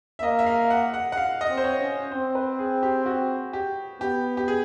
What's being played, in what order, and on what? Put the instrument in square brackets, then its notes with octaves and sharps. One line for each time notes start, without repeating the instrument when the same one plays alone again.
[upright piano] E5
[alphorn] A#3 [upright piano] D#5
[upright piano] E5
F5
F#5
F#5
F#5
F5
D#5
[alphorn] C4
[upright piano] C5
C#5
[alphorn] C#4
[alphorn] C4 [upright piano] C5
[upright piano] B4
G#4
G4
F#4
G4
[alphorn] B3 [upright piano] G4
[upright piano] G4
G#4